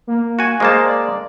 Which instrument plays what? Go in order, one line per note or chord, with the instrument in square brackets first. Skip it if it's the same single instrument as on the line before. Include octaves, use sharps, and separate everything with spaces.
[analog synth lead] A#3
[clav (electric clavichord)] F#4 G#5
[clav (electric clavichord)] G#3 A#3 A5 [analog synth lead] C5
[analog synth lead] D5